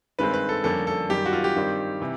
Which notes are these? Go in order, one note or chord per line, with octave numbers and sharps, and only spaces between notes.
G2 D#3 G#3 C4 B4
B4
A4
F2 D3 G3 A#3 C#4 A4
A4
F#2 D#3 G3 G4
F#4
F4
G4
G2 D#3 G3 C4
C3 E3